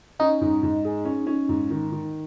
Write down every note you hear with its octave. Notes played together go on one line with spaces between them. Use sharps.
C#4 D#4
G#2
G#2
G#4
C#4
C#4
G#2
D#3
D#3